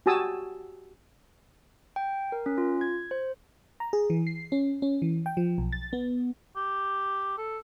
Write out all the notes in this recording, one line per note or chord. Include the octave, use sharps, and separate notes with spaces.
F#4 G4 G#5 A5 D#6 E6
G5
A#4
C#4
F4
G#6
C5
A#5
G#4
E3
C7
C#4
C#4
E3
G5
F3
B1
A6
B3
G4
A4